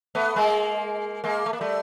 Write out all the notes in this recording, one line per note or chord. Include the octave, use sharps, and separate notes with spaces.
A3 B3
G#3 A#3
G#3 A#3
A3
A#3
G3 A3